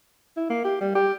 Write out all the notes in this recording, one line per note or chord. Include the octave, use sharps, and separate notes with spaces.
E4
A#3
G4
G3
G4